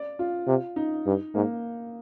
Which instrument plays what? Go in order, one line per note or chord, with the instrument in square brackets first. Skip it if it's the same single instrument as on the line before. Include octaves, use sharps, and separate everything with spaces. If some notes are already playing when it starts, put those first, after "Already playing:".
Already playing: [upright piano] D5
F4
[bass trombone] C3
[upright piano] D#4
[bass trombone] G2
[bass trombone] G#2 [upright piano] A#3